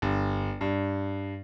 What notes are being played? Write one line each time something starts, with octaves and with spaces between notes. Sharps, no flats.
G1
G2